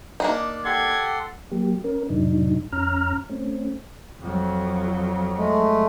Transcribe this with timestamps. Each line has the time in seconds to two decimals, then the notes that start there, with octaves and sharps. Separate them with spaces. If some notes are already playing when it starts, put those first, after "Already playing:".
0.20 A#3 D4 D#4
0.65 G4 A4 F#5 C6 G#6
1.52 F#3 A#3 G4
1.84 C#4 A#4
2.09 F2 A2 C3 F#3 D4 D#4
2.72 F2 C#4 A#5 F6
3.29 A3 C4 C#4
4.21 F2 F#3
5.37 G#3 A3